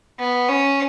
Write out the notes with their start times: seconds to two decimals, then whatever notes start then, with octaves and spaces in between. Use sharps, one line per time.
0.19 B3
0.49 C#4